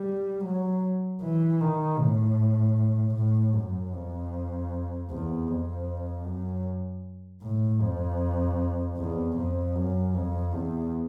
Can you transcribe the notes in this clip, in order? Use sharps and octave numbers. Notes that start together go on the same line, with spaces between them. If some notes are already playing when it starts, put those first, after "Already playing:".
Already playing: G3
F#3
E3
D#3
A2
A2
F#2
F2
E2
F2
F#2
A2
F2
E2
F2
F#2
F2
E2